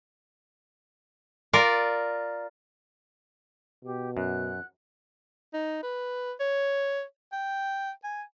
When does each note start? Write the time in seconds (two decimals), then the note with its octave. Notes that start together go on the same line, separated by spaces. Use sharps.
1.53 F4 A#4 D5
3.84 B2 G4
4.17 F#2 F#5 F#6
5.53 D#4
5.83 B4
6.40 C#5
7.32 G5
8.04 G#5